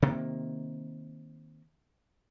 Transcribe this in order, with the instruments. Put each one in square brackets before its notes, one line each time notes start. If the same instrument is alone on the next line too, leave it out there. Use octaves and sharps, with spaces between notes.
[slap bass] C3 D#3 A#3